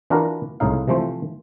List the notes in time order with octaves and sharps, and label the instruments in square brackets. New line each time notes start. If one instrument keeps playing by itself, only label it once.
[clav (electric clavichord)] E3 D4 F4 F#4 A#4 B4
C2 A2 C#3 D#4 F5
C3 E3 F3 A3 C5